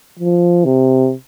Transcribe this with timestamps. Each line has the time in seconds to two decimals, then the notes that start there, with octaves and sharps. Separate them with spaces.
0.19 F3
0.65 C3